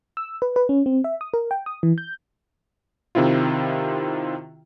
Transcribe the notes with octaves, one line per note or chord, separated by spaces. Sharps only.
E6
B4
B4
C#4
C4
E5
D#6
A#4
G5
D#6
E3
G6
C3 D#3 C4 E4 F4